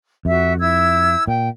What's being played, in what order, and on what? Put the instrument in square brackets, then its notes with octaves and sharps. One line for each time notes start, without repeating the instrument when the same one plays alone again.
[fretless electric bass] F2 [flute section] F#4 E5
[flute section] E4 E6 G#6
[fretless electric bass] A#2 [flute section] G5